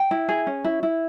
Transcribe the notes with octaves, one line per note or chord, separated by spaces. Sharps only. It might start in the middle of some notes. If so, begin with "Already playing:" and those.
Already playing: G5
E4
G#4
C#4
E4
E4